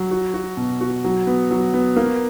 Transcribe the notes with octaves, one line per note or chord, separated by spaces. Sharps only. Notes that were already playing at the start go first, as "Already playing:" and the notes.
Already playing: F#3
F#4
F#4
B2
F#4
F#3
B3
F#3
B3
A#3